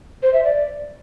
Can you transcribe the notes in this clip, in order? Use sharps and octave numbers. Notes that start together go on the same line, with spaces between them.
C5
E5
D5